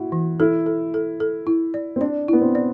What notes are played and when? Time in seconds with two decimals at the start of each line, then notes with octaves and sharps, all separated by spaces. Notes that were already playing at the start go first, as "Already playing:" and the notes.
Already playing: E4 F#4
0.12 E3
0.40 E4 A4
0.66 A4
0.94 A4
1.20 A4
1.47 E4
1.74 D5
1.96 C4
2.01 D4 D5
2.28 B3 E4
2.41 C4
2.55 D5